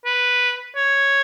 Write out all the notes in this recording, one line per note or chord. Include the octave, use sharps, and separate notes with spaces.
B4
C#5